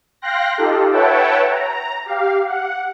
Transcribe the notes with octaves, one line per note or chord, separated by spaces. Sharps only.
F5 G5 C6 F#6 A#6
D#4 F4 G4 A4
B4 C#5 E5 F#5 G5 A5
A#5
G4 F5
F#5